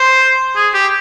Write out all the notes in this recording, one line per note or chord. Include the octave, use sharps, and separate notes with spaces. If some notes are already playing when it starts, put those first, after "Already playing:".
Already playing: C5
G#4
G4